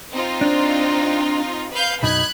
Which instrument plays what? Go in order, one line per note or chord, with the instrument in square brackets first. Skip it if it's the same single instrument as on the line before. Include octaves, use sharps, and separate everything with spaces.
[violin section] C4 D#4 F4
[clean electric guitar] D4
[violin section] B4 F5 G6
[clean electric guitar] B1 F#2 D#4 [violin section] B5 F#6 G#6